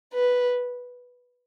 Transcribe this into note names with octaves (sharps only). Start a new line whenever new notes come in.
B4